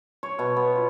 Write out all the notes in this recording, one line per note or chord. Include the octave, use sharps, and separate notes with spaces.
C#5
B2
B3
F4